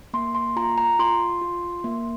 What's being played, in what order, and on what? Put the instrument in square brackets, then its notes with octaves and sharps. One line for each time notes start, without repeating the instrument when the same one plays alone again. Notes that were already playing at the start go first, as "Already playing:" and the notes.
[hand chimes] A#3 C6
C6
F4 A#5
A#5
F4 C6
F4
A#3